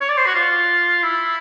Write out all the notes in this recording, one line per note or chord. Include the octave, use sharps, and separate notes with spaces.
C#5
D5
C5
F#4
F4
E4